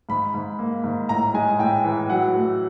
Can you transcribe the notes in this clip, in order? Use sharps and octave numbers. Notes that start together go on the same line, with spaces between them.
G#2 B5
G#2
A#3
G#2
A2 A#5
G#3 G#5
A2 G5
E3
F#3 F#5
A3